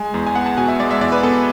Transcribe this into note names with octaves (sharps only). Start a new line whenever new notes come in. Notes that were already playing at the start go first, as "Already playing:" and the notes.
Already playing: G#3 G#5
E2
G#5
B3 F#5
A5
B2 G#5
E5
G#3 D5
E5
E2 D5
B4
B3 A4